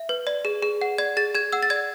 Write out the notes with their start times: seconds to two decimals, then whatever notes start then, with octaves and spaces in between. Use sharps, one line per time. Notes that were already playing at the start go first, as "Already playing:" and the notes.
Already playing: E5
0.09 B4
0.27 D5
0.45 G#4
0.62 G#4
0.81 F#5
0.98 D5 G#6
1.17 G#4 A6
1.35 G#4 G#6
1.52 F#5 E6
1.63 A6
1.70 D5 G#6